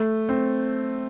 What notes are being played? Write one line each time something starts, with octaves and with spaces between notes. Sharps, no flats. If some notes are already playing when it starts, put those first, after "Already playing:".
Already playing: A3
C4